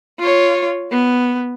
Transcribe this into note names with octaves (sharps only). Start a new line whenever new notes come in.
F4 C#5
B3